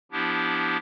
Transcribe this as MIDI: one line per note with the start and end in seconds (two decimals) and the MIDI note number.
0.12 0.77 53
0.12 0.77 59
0.12 0.77 62
0.12 0.77 64
0.12 0.77 67